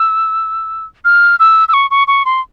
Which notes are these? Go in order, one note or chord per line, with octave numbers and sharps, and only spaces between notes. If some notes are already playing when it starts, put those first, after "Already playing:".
Already playing: E6
F6
E6
E6
C#6
C#6
C#6
C6